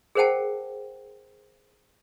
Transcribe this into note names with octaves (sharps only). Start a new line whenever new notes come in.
G#4 A#4 C5 F#5 G5 A5